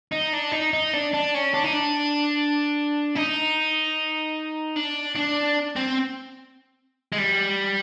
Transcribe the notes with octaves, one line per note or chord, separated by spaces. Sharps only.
D#4
D4
D#4
D#4
D4
D4
C#4
D4
D#4
D4
D#4
D4
D4
C4
G#3
G3